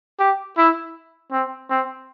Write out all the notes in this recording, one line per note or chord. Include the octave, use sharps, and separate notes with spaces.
G4
E4
C4
C4